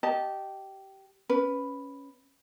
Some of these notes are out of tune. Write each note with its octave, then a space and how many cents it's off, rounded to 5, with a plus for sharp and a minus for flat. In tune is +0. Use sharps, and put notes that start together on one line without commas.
G4 -15 D#5 +0 A5 -15
C#4 +0 B4 +0